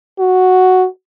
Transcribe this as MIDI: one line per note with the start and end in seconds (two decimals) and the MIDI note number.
0.19 0.86 66